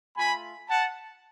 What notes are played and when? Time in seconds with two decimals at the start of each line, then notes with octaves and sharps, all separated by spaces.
0.16 A3 F4 G#5 B5
0.69 F#5 A5